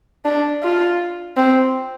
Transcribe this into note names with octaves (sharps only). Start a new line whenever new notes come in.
D4
F4
C4